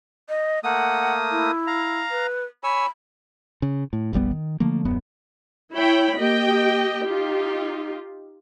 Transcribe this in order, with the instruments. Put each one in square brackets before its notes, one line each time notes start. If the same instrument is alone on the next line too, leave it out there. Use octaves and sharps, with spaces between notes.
[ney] D#5
[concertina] A3 A#3 D#6 [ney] F#5
[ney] E4
[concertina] F5 A#5
[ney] B4
[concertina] C#5 G#5 E6 [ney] B5
[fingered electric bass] C#3
A2
F1 A#1 G3 B3
D#3
D3 F3 A3 A#3
D#1 F#2 B3
[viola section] E4 C#5 G5 B5
A#3 G4 D#5 G5
D#4 F4 G4